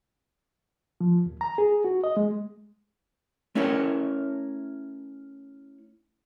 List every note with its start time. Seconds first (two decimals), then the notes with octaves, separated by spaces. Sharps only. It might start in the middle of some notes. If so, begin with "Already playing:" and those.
1.01 F3
1.26 D#2
1.41 A#5
1.58 G#4
1.84 F#4
2.04 D#5
2.17 G#3
3.55 A3 C#4 E4 A#4 C#5